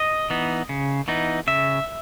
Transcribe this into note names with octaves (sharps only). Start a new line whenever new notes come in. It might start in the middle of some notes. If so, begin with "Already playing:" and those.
Already playing: D#5
E3 B3 D#4
C#3
E3 B3 D#4
C#3 E5